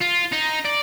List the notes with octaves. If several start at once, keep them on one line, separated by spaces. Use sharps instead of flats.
F4
D#4
D5